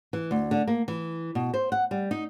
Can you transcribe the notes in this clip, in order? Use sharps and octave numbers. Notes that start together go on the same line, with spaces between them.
E3
D2
D3
A#3
E3
B2
C5
F#5
G3
D#4